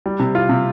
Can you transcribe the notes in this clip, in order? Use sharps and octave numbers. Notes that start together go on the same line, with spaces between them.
G3
C3
F4
C3